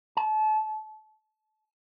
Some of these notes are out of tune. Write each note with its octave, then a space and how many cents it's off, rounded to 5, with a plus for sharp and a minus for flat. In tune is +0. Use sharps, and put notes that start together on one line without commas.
A5 -30